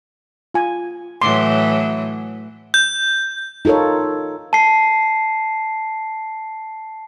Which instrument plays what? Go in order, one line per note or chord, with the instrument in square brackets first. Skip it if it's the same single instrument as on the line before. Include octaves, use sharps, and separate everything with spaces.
[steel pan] F4 G#5
[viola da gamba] A2 E3 F#3 [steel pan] C6 D6
[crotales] G6
[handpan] D#4 F4 A4 A#4 C#5
[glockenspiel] A5 C7